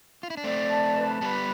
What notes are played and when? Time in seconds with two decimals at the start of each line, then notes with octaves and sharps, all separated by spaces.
0.23 F4
0.30 E4
0.37 D4
0.44 A3 C4 D5
0.70 A5
0.96 B4
1.21 G3 B3 B4